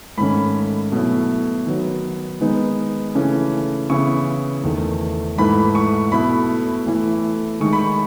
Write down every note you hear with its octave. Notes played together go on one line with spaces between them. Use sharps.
G#2 D#3 A3 C#4 B5
B2 F#3 A3 E4
D#3 F#3 B3
D#3 G#3 B3 D#4
C#3 E3 A3 C#4
C#3 E3 B3 E4 C#6
E2 D#3 A3
G#2 E3 A3 B5
C#6
B2 A3 E4 B5
A2 E3 A3 E4
D#3 G#3 D#4 C#6
B5
C#6